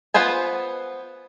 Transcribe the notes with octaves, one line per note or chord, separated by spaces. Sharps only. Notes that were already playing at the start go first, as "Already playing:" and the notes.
B3 F4 B4 C5 G#5